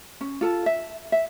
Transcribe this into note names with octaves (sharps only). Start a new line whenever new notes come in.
C#4
F4 A4 A5
E5
E5